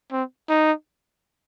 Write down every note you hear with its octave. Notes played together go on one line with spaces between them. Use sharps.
C4
D#4